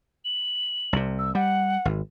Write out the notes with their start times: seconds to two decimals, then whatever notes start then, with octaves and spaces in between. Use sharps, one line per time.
0.25 F#7
0.93 C2 C3
1.19 E6
1.35 G3 F#5
1.85 G#1